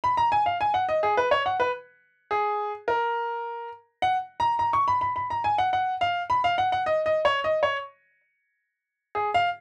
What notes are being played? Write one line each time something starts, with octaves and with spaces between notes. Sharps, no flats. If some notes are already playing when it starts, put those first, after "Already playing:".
B5
A#5
G#5
F5
G#5
F#5
D#5
G#4
B4
C#5
F#5
B4
G#4
A#4
F#5
A#5
A#5
C#6
B5
B5
B5
A#5
G#5
F#5
F#5
F5
B5
F5
F#5
F#5
D#5
D#5
C#5
D#5
C#5
G#4
F5